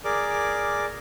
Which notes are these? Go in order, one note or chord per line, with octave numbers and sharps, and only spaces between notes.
G#4 A#4 D5 D6